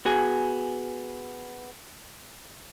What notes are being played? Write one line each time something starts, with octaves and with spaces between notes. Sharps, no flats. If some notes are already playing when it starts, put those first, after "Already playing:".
B3 F#4 G#4 G#5